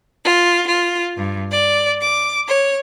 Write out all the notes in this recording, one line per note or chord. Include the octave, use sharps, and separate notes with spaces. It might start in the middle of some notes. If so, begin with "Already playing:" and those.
F4
F4
G2
D5
D6
C#5